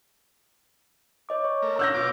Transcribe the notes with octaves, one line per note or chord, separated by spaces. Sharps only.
C#5 D#5 D6
C#5 C#6
A3 A#4
D4 F5 F#5 E6 G6 A#6
B2 F4 D6